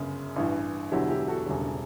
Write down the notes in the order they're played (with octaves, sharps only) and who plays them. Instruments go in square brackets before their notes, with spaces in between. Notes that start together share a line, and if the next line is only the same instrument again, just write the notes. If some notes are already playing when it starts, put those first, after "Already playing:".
Already playing: [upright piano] G1 F#2 C#3
A1 G2 E3
E1 E2 D3 F#3 E4 G4
E4 G4
F#4 A4
E1 D2 C#3 G3